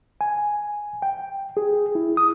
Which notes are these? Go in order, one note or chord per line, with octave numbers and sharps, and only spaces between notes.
G#5
G5
G#4
E4
D#6